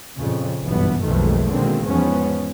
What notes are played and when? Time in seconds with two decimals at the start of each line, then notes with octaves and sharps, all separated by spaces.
0.16 F2 A#2 C#3
0.64 F#1 B1 G2 E3 G3 B3
1.04 B1 F2 B2 D#3 G#3 A3
1.53 B2 D3 D#3 G#3 A#3 C4
1.88 E2 G#2 F3 B3 C#4